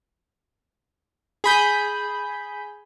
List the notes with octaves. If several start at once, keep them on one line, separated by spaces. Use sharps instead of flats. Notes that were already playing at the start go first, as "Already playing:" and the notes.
G#4 B5 G6